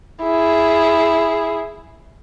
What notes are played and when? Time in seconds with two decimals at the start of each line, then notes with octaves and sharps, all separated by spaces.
0.23 E4 G#4